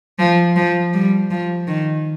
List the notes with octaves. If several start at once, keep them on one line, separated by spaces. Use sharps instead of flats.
F3
F3
G3
F3
D#3